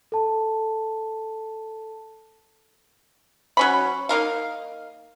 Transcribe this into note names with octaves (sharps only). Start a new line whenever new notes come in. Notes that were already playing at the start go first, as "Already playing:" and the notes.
A4 A5
F#3 C#4 B5
A#3 D#4 A#4 F5